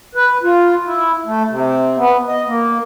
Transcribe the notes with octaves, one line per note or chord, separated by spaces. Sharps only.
B4
F4
E4
A3
C3
B3
D#5
A#3